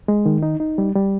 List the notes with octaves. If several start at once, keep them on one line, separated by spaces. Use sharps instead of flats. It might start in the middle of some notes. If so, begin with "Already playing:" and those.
G#3
D#3
D#4
D#4
G3
G3